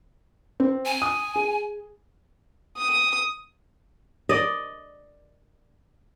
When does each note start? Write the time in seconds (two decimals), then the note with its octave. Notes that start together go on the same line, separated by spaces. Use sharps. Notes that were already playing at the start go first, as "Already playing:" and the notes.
0.60 C4
0.85 G#5
1.02 D#6
1.36 G#4
2.78 D#6
4.29 D5 D#5